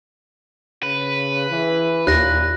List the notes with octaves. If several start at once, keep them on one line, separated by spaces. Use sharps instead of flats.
C#3 B4
E3
D#2 A#2 F#6 A#6